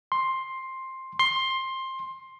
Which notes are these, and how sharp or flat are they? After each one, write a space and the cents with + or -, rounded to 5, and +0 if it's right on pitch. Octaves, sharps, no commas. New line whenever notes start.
C6 +10
C6 +15